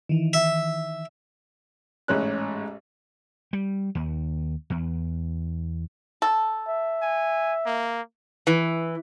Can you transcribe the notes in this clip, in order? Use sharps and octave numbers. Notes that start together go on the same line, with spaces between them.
D#3 E3
E5
A1 G#2 C#4 F#6
G3
D#2
E2
A4
E5
G#5
A#3
E3